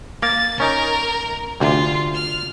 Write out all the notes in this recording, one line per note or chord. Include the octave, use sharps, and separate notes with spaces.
A#3 A#4 A6
C#4 D#4 A#4
D2 C3 F4
F6